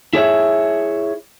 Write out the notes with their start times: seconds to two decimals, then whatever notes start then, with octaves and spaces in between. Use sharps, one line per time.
0.13 E4 G#4 C#5 E5